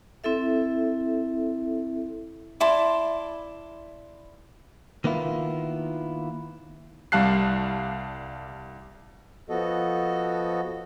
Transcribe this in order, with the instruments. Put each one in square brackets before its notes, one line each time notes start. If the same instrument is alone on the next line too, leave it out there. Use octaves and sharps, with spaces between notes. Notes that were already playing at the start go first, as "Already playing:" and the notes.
[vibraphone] C4 E4 A4 E5
[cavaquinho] E4 D5 A5 C6
[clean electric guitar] D#3 A#3 B3 E4 F4
[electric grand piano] C2 G3 F5 A5 F#6 C7
[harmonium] F3 B3 F#4 A4 D#5